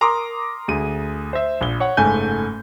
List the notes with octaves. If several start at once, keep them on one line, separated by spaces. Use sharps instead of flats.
A#4 A#5 C6 D6 D#6
D2 G#4 D#7
C5 E5
A#1 G7
C#5 F#5
F#1 G#2 A3 G#5 G6